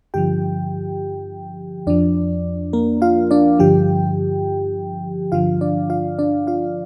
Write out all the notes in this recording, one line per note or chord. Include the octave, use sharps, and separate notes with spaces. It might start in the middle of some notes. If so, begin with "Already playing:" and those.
G2 D3 F3 G4 G5
F2 F3 D4 D5
A#3 A#4
F4 F5
D4 D5
G2 D3 F3 G4 G5
G2 D3 F3 F4 F5
D4 D5
F4 F5
D4 D5
F4 F5